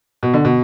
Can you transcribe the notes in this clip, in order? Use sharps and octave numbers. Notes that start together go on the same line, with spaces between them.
B2
D3
B2